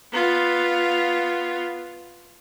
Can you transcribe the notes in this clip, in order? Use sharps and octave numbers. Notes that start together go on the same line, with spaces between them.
B3 F4